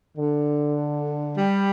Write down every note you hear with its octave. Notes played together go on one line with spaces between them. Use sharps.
D3
G3